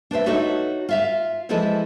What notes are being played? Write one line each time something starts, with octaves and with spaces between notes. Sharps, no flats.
D4 B4 C5 E5
D#4 F#4 A4 C#5 D#5 E5
F4 E5 F5
E3 F3 G#3 E4 A4 D#5